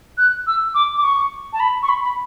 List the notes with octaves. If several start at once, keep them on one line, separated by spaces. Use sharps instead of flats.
F#6
E6
D6
D6
C#6
A5
B5
C#6
B5
B5